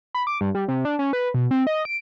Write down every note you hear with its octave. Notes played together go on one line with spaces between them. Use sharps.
B5
D6
G2
G3
C3
D4
C#4
B4
B2
C4
D#5
D7